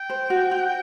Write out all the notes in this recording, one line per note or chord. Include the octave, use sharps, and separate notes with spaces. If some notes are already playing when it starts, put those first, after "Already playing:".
Already playing: G5
C5
F#4
F#4